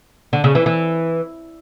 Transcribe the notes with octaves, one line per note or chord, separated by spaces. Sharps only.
D3
C#3
E3
E3